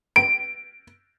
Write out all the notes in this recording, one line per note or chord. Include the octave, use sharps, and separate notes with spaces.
D7